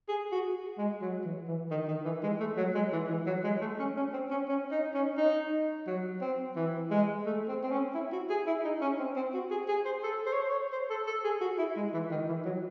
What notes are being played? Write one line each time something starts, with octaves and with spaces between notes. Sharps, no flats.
G#4
F#4
G#3
F#3
E3
E3
D#3
D#3
E3
G#3
A3
F#3
G#3
E3
E3
F#3
G#3
A3
C#4
C#4
C4
C#4
C#4
D#4
C#4
D#4
F#3
C4
E3
G#3
A3
C4
C4
C#4
E4
F#4
G#4
E4
D#4
C#4
C4
C4
F#4
G#4
G#4
C5
A4
C5
C#5
C5
C#5
C5
A4
A4
G#4
F#4
E4
G#3
E3
D#3
E3
F#3